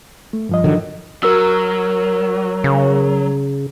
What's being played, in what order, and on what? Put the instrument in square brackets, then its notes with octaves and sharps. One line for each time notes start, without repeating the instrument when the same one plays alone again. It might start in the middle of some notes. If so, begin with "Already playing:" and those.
[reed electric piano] A3
G2 F3 D#5
[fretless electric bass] D3 D#3 F#3
[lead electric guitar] F#3 [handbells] A#4 E6
[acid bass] C#3